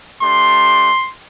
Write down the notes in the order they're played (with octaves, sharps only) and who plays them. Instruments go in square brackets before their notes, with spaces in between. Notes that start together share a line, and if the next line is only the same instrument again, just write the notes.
[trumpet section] A3 D4 G4 C6